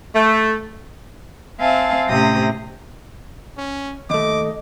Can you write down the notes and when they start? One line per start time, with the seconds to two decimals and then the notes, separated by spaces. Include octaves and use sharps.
0.15 A3
1.59 C4 E5 F5 G#5 A5
2.08 A2 C3 C#4 G5 D#6 A#6
3.57 C#4
4.10 D#2 A3 D#5 D6